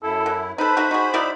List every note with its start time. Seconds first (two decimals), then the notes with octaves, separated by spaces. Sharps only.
0.03 F#2 E4 A4
0.26 F#3
0.58 D#4 A4 B4 C5 B5
0.77 A3 D#4 F#4
0.91 D#4 F#4 G#4
1.14 F#3 D#4 E4 D5